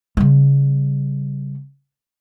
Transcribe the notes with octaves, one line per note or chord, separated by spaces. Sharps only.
C#3 G3